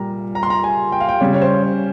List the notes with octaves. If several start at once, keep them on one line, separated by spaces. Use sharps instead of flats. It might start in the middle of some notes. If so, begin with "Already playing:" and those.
Already playing: A#2 G3 A#5
A#5
C6
A#5
G#5
G5
F5
G5
C#3 G3 C#5
C#5
C5
C#5